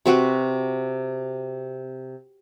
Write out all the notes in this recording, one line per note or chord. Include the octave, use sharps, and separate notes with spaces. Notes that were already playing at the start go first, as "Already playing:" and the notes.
C3 C4 F#4 B4